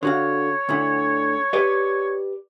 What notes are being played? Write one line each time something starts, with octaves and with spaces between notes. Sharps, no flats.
D3 F#4 C#5 F5
D2 D3 E4
G4 B4 D5